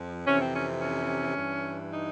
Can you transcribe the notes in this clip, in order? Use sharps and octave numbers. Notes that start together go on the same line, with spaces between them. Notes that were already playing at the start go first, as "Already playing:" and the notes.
Already playing: F2 F3
F2 C3 E3 C#4
C4
C#4
C#4
G2 E3
D#4